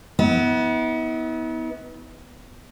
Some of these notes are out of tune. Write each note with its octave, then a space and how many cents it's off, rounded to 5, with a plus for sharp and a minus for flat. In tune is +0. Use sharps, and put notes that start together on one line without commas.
B3 +0 E4 -45